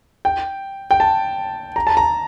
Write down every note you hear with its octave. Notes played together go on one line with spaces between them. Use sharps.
G5
G5
A5
A#5
A5
A#5